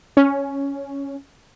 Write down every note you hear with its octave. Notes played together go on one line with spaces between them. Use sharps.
C#4